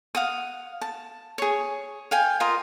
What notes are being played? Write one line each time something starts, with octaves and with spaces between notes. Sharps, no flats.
F5 F#5 D#6
A5
G#4 C#5
F5 G5 G#5
F4 A#4 C5 D#5